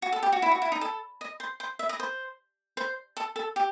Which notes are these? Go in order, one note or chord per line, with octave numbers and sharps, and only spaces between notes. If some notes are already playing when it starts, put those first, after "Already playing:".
F#4
A4
G4
F#4
E4
F#4
E4
D#4
A4
D#5
C5
C5
E5
D#5
C5
C5
A4
A4
G4